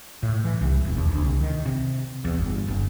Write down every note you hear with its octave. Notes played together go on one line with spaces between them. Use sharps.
A2
E3
C2
E1
D#2
D2
C2
D#3
C3
E2
G1
F#1